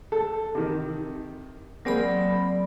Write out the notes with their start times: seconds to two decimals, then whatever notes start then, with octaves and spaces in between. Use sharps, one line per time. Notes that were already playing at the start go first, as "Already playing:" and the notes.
0.12 A4
0.55 C3 D#3
1.85 F#3 A#3 C4 G#4 D5 B5